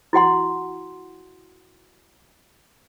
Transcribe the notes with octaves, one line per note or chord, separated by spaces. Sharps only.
E4 F#4 F#5 C6